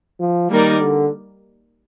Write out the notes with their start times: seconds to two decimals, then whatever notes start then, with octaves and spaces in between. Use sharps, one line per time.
0.19 F3
0.50 D#3 G3 A#3 D#4 A#4 D5
0.81 D3